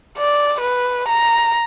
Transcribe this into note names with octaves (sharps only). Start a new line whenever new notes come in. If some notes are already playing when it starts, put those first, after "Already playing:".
D5
B4
A#5